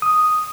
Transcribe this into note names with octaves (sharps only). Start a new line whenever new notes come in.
D#6